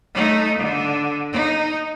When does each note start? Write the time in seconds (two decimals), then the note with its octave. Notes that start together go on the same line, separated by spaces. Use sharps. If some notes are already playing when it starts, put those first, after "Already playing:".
0.14 A3 D#4
0.58 D3
1.33 D#4